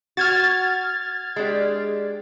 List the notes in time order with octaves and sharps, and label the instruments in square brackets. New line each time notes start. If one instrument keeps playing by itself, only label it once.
[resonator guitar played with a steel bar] F#4 [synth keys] F6 G#6 A6
[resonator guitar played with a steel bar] G#3 D4 G4